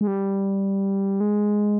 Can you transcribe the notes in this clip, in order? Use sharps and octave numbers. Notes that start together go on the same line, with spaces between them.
G#3
G3
G#3